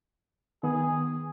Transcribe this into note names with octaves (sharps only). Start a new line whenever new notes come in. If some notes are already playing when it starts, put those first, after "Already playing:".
D#3 B3 G#4